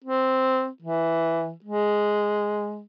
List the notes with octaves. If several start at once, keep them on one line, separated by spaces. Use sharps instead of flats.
C4
E3
G#3